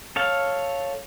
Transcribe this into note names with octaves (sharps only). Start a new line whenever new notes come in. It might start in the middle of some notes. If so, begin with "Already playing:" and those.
A4 C#5 F5